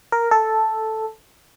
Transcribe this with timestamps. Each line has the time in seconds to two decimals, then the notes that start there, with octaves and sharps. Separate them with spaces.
0.12 A#4
0.31 A4